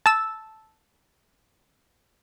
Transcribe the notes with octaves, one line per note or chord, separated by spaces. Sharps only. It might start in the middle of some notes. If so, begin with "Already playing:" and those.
A5 E6